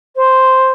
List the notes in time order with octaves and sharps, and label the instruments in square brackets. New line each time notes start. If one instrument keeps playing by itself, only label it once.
[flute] C5